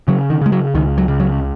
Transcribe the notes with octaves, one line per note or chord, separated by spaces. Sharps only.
C#3 F#3
D#3
C#3 G#3
F#3
C#2 D#3
F#3
C#3
F#3